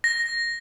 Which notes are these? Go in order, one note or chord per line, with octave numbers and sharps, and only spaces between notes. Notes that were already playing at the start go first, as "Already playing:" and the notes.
A#6